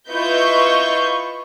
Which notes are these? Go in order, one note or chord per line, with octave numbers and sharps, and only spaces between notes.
E4 F4 B4 D#5 C#6 G6